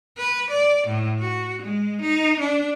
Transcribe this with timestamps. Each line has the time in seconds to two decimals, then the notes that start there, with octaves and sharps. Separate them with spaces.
0.17 B4
0.51 D5
0.88 A2
1.19 F#4
1.63 G#3
2.02 D#4
2.40 D4